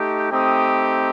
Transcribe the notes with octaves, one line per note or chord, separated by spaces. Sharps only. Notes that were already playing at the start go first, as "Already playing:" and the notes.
Already playing: A3 D#4 G4
A3 C4 D#4 G4 D#6